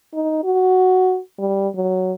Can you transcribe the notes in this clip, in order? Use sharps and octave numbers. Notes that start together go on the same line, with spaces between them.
D#4
F#4
G3
F#3